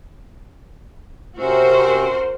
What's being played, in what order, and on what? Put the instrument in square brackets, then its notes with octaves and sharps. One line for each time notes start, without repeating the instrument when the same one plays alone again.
[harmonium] C3 C#4 E5 [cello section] F#4 A#4 C5